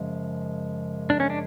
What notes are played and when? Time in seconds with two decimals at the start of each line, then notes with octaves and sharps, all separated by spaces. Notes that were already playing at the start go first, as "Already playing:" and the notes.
Already playing: F#2 C#3 F3 G#3
1.10 D4
1.20 C#4
1.30 D4